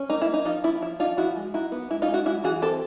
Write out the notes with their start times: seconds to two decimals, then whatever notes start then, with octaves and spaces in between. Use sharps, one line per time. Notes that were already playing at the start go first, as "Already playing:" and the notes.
Already playing: C#4
0.10 A#3 D#4
0.21 E4
0.28 A#3
0.34 D#4
0.45 F3 D#4 F4
0.64 F3 E4
0.82 F3 E4
1.00 D4 D#4 F4
1.17 F3 E4 F#4
1.36 G#3
1.54 D#4 E4 F#4
1.72 B3
1.90 G#3 E4
2.02 D#4 F4
2.08 G#3
2.14 E4 F#4
2.26 G#3 E4 F#4
2.44 E3 F#4 G#4
2.62 C4 G4 A4